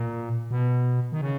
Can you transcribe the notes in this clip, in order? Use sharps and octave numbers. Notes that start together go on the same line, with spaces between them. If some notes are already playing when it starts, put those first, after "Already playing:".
Already playing: A#2
B2
D#3
C#3